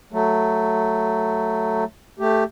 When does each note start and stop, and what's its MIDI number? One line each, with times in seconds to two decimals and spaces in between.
0.12 1.84 54
0.12 1.84 57
2.19 2.44 57
2.19 2.44 67